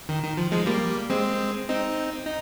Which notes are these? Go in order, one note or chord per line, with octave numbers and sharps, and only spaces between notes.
D#3
D#3
F3
F3 G#3
G3 A#3
G#3 C4
C4 D#4
D#4